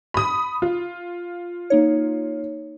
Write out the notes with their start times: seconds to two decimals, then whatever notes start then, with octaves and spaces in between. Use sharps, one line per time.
0.14 B5 D#6
0.62 F4
1.70 A#3 D#4 C#5